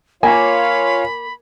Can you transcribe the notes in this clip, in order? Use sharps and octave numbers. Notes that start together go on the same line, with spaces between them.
A#3 F4 C#5 F5 G#5 B5